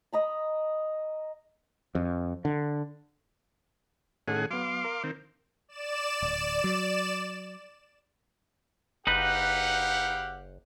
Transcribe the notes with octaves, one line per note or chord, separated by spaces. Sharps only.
D#5 A#5 B5
F2
D3
A2 D#3 C#4 G#4 A4 F#5
F#3 B3 F5 C6 D6
A#4
D#3 C4
D5 E7
D1
F#3
F#1 D#4 G4 B4 F5 F#5